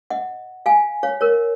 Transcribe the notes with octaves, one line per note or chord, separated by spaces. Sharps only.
D#5 F#5
F5 G#5
C#5 F5
A#4 C#5